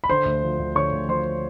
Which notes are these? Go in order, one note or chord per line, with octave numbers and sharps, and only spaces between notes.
B5
D3 C5 C6
D2
F3
D2
D3 C#5 C#6
D2
F3 C5 C6